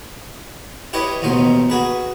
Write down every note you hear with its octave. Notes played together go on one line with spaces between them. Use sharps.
E4 G4 B4 C#5 D#5
A1 D#2 B2 D#4 C5
F#4 G#4 B4